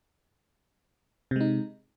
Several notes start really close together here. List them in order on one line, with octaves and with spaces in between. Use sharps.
C3 G#3 D#4